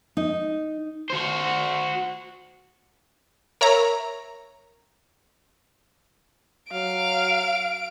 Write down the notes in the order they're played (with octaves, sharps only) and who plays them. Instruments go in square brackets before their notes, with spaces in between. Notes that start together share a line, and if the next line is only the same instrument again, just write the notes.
[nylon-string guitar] D#4
[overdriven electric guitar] F#4 C5
[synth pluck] A#4 C#5 E5 A#5
[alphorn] F#3 [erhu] F5 [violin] D7